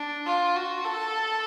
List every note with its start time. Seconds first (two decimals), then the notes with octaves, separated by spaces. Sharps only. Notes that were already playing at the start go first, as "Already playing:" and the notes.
Already playing: D4
0.26 F4
0.56 F#4
0.85 A4